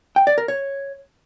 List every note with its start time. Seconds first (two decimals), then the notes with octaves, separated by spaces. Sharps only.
0.16 G5
0.27 D5
0.38 A#4
0.48 C#5